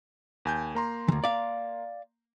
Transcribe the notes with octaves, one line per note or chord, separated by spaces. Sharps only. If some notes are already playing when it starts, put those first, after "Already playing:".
D#2 G#5 G6
A#3 A#5 C6
D2 E3
D5 F5